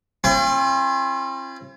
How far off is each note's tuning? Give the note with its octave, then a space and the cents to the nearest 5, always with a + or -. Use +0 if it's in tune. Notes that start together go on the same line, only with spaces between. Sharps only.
C4 +45 F4 -45